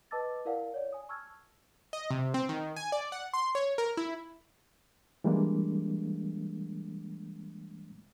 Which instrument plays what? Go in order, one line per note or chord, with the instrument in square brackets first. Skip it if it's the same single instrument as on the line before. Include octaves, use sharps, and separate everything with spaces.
[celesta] B4 D#5 A5 D6 E6 A6
E4 A#4 D5 F5 F#5
C#5 D5
G#5 D#6
A5 C#6 E6 F6 G#6
[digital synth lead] D#5
C3
C4
D#3
G#5
D5
F#5
C6
C#5
A#4
E4
[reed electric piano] E3 G3 G#3 A#3 D4